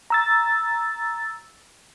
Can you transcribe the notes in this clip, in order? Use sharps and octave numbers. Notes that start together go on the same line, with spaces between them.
A#5 E6 A6